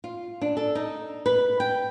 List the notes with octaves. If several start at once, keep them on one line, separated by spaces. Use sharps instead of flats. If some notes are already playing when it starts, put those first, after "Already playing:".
F4
D4
A4
D#4
B4
G5